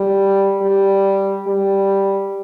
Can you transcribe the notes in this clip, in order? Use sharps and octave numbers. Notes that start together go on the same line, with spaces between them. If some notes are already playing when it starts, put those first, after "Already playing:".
Already playing: G3
G3
G3